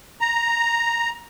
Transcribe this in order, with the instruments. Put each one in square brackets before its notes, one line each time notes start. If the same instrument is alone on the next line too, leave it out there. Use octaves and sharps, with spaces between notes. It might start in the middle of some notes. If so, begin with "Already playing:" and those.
[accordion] A#5